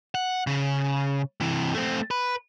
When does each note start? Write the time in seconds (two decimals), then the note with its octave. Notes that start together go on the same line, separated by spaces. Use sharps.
0.15 F#5
0.47 C#3
1.40 C3 E3
1.75 A3 C4
2.11 B4